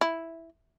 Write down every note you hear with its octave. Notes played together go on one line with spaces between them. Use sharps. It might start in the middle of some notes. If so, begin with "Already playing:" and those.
E4